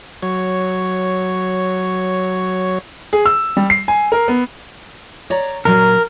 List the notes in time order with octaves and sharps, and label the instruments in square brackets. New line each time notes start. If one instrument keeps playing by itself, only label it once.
[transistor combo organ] F#3 C#5
[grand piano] G#4
E6
G3
C7
G#5
A#4
B3
[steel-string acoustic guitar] C#5 D5 A#5
[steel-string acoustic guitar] A#2 F#3 [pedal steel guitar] A#4